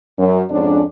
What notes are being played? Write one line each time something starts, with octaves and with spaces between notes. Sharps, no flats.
F#2
F2 G#2 C#4 D4